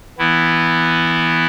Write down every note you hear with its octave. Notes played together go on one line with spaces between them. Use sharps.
E3 B3 E4